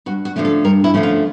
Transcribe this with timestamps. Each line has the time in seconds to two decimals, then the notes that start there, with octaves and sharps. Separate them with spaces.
0.06 G2 F#4
0.25 F#4
0.36 D3 F3 A3 C#4
0.45 A4
0.65 G2 A#4
0.84 E4
0.94 D3 F3 A3 C#4
1.03 F4